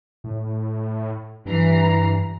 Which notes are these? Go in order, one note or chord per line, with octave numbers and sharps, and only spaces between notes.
A2
G2 E3 A#5 C7